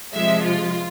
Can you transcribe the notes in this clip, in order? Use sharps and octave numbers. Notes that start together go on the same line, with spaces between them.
C3 F3 G#3 E5
F4